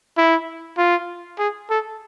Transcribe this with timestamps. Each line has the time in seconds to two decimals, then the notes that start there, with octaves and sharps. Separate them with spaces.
0.18 E4
0.78 F4
1.39 G#4
1.70 A4